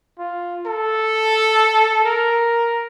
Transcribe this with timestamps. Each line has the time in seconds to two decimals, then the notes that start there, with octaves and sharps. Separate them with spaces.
0.19 F4
0.66 A4
2.04 A#4